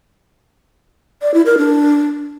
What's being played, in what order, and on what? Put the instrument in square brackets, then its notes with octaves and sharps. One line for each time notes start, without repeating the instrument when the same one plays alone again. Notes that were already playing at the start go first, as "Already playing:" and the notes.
[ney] D5
E4
A#4
D4